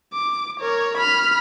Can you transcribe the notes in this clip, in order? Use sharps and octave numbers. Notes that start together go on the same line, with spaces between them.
D6
A#4 C#5
B5 F6